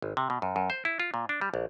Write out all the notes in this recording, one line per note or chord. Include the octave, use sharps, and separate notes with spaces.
G#1
C3
B2
F#2
F#2
C5
E4
F4
A#2
D4
G3
A#1